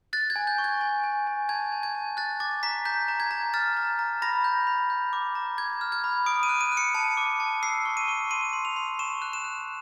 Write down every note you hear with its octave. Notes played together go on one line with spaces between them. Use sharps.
F#6 A6
G#6
G#5
G6
C#6
G#6
G#5
G#5
G#5
A5 G#6
A5
G#6
A5
F#6 A6
D6 A6
A#5 B6
A#5 G6
A#5
G#6
A#5
F6 A6
A#5
A#5
B5 A#6
G6
B5
G6
D6
A#5
D6 G#6
F6
G#6
B5
D#6 D7
D#7
F#6
D#7
F#6
C#7
A5
D6
A5
E6 C7
C#6
D#7
C#6
C6 D#7
C6
F7
C6
C#6 E7
F#6
E7
F#6